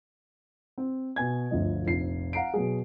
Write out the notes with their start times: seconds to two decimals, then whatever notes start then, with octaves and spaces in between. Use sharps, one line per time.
0.78 C4
1.16 B2 G#5 G#6
1.51 G1 D2 F3 D#5
1.86 F1 A#1 C7
2.33 F5 F#5 A#5 C7 D7
2.54 B2 F#3 G#4